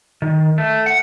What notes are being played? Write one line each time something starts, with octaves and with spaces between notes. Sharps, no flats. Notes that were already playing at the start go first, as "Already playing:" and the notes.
D#3
A3
F#5